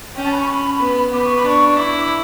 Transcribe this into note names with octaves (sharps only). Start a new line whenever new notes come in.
C#4 G5
A5
B5
C#6
B5
B3
B3 D6
C#6
B5
D4 C#6
E4 D6
D6
D6